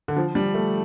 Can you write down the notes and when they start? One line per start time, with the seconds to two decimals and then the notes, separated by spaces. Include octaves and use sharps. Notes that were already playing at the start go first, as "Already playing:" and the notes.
0.08 D3
0.17 F3
0.35 G3
0.54 A3